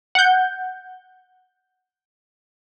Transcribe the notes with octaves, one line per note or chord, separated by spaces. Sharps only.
F#5 G6